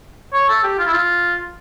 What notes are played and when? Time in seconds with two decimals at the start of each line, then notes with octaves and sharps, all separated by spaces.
0.33 C#5
0.49 A4
0.64 G4
0.79 F4
0.87 E4
0.93 F4